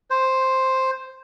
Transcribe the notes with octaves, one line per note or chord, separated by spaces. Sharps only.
C5